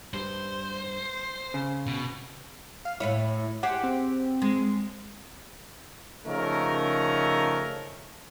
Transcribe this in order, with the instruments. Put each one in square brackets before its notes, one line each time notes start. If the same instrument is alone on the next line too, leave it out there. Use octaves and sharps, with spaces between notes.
[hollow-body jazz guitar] G2 [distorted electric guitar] C5
[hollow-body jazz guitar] C#3
[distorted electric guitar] B2
[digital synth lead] F5
[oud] A2 B4 C#5 [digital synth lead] E4
[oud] G4 G#4 C5 [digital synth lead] F#5
[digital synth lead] C4
[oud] G#3
[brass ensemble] C#3 F3 A3 C#4 D#4 A#4